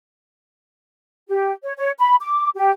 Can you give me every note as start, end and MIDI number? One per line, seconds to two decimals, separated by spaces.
1.29 1.52 67
1.64 1.74 73
1.77 1.90 73
1.99 2.15 83
2.21 2.49 86
2.56 2.71 67